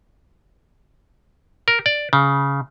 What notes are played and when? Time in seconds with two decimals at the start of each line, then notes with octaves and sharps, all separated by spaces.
1.68 A#4
1.86 D5
2.13 C#3